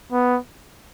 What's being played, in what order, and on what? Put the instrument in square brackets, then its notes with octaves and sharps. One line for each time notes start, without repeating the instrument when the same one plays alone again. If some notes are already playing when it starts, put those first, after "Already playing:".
[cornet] B3